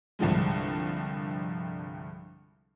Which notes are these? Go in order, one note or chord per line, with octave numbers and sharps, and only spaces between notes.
C2 G2 D3 F3 G#3